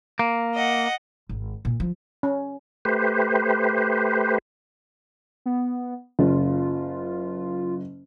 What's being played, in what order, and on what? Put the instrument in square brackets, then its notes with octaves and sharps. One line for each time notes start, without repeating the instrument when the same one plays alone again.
[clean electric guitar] A#3
[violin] D#5 F#5
[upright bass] G#1
A#2
F3
[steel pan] C#4
[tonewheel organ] A3 G4 B4 C5
[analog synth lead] B3
[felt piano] F#1 [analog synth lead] F4